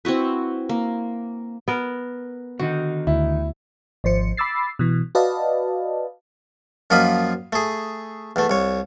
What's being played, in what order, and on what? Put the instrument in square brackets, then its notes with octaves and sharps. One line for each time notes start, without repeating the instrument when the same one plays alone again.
[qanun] C4 E4 F#4 B4
A#3
[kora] B3 A#4
[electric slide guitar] D3 D#3 D#4 [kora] F#4
[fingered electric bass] D2 [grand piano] E4
[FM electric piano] G#1 F3 C5 C#7
B5 D6 E6 A6 C7
B2 E3
F#4 B4 D5 D#5 F5 A5
[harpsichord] F#2 F3 A#3 F4 D#5 B5
A3 G#4
E2 A3
C2 C#5